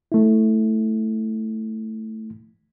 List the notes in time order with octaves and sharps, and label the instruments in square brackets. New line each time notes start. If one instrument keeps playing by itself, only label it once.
[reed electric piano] A3 E4